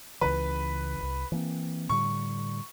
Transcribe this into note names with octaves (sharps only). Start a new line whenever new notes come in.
C#2 C#3 E3 B4
D#1 C2
E3 A#3 C4
A2 D3 G3 C#6